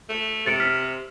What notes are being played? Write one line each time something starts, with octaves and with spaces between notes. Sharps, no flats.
A3
C3 A6 C#7 D7
F6 B6